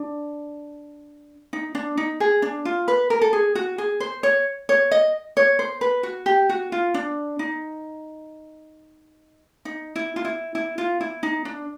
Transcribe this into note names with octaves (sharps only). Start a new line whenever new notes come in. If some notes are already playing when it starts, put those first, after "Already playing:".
Already playing: D4
D#4
D4
D#4
G#4
D4
F4
B4
A#4
A4
G#4
F#4
G#4
C5
C#5
C#5
D#5
C#5
C5
B4
F#4
G4
F#4
F4
D4
D#4
D#4
E4
F4
E4
E4
F4
E4
D#4
D4